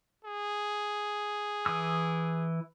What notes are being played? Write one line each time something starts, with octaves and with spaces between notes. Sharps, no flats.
G#4
E3 D#6 E6